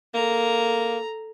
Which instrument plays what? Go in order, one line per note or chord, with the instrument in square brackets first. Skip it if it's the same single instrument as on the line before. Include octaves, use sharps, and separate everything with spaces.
[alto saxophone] A#3 [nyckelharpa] A4 A#5